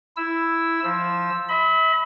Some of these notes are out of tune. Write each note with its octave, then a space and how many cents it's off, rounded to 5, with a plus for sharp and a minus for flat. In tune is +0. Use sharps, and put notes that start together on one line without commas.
E4 +0 E6 +0
F3 +0 E6 +0
E5 -40 B5 +10